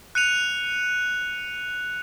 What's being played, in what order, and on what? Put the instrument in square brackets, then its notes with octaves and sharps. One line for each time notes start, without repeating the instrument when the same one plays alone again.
[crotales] F#6 C#7 D#7 F7